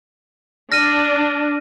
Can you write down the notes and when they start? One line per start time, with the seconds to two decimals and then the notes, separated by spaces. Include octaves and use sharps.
0.72 D4 F6 A#6 D#7